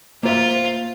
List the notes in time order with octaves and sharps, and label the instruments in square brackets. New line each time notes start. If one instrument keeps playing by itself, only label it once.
[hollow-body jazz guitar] A#3 C5 E5 [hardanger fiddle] F4